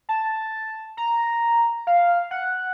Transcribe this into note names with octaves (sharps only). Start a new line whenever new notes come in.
A5
A#5
F5
F#5